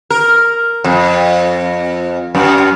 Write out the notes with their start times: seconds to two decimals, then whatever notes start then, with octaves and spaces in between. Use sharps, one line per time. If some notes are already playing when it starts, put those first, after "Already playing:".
0.10 A#4
0.84 F2
2.35 F#2